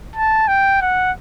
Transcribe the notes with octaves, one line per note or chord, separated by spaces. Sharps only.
A5
G5
F#5